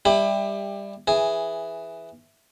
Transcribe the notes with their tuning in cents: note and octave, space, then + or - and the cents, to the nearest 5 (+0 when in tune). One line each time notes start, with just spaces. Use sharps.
G3 +20 E4 +5 G4 +25
E3 +0 G#4 +0